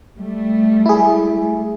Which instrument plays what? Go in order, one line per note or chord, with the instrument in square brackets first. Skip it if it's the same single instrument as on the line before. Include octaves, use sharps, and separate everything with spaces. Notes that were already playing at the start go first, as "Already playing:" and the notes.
[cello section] G3 A3
[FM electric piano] E4 G#4